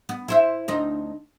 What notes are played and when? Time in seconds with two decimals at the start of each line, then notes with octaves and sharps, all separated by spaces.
0.09 B3
0.28 E4 C5 E5
0.68 D2 C4 D#4